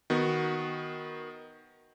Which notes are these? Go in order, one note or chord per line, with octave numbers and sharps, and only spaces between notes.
D#3 B3 F#4